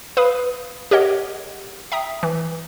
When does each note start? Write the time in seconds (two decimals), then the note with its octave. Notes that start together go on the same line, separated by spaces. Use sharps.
0.17 B4 F5 B5 D#6
0.91 G4 A#4 C#5 D#5 F#5
1.92 E5 G5 A#5 D#6
2.23 E3